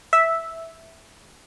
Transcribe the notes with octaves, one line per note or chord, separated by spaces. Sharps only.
E5